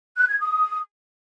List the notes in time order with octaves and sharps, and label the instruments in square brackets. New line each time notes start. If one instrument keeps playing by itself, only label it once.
[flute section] F#6
G#6
D#6